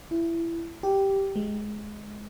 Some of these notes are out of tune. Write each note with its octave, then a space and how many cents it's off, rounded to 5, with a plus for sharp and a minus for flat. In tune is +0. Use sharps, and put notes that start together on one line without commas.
E4 +20
G4 -5
G#3 +15